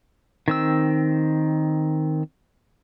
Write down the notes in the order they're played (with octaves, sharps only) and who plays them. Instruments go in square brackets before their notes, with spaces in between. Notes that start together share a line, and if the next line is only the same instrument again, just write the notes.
[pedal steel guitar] D#3 C4 E6